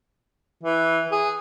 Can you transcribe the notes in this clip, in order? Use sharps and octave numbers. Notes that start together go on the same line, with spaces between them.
E3
G#4